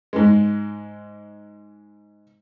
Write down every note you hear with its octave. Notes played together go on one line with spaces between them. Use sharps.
G#2 G#3